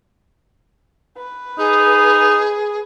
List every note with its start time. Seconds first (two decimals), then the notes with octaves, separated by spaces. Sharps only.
1.17 B4
1.58 D#4 G#4